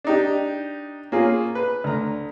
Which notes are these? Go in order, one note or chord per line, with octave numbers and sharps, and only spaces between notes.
D4 D#4 G4
A#3 C#4 F4 G#4
B4
D2 A#5